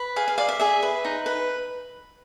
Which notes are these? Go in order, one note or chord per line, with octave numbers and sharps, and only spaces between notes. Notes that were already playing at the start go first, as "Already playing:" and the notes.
Already playing: B4
G#4 F5
F5
D5 F5
E5
G#4 E5
B4
D#4
B4